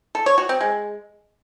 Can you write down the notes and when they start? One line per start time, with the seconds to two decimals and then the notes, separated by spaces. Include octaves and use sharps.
0.15 A4
0.26 C#5
0.38 F#4
0.49 C4
0.61 G#3